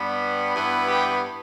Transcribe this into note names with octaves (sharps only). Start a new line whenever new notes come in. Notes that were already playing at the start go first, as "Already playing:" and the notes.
Already playing: G2 G3 B3
G2 E3 B3
G4